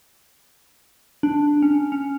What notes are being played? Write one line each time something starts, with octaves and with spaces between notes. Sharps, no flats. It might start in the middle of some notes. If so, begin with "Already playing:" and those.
D4
C#4
C#4